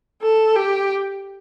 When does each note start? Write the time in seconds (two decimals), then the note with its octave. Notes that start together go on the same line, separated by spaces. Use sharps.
0.22 A4
0.56 G4